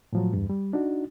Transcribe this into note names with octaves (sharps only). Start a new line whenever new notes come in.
A2 F3 F#3
E2 G2
G3
D4 D#4 F#4